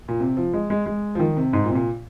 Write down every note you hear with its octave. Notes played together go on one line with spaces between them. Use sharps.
A#2
C3
F3
G#3
G#3
G#3
F3
D#3
C3
G#2
A#2
C3
A#2